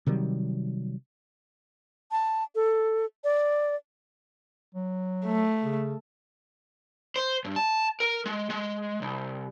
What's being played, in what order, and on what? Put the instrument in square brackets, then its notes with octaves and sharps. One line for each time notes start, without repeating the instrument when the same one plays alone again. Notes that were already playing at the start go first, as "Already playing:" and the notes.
[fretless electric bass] C3 D#3 F#3 G3
[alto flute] A5
A4
D5
[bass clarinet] F#3
[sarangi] A3
[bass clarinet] C#3
[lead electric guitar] C5
G2
A5
A#4
G#3
G#3
C2